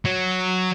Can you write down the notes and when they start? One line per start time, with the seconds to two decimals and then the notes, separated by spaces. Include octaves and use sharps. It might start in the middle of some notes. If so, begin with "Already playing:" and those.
0.05 F#3